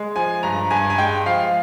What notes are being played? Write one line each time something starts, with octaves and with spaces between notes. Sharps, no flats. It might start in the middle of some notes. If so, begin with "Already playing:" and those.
Already playing: G#3
F3 G#5
G2 A#5
G2 G#5
G#5
G#3 G5
F3 F5